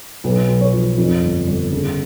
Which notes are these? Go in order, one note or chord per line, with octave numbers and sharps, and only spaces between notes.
B1 B4
B1
C#5
F3
F2
G1
G1
C#3